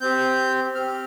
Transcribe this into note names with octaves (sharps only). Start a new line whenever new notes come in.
C4 G4 G6
C4 G4 F6